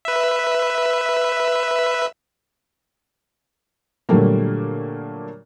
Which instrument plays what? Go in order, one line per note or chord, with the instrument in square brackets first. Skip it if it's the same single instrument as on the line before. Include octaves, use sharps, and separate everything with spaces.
[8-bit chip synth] B4 E5
[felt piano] A#2 D3 F#3 G3 A3 A#3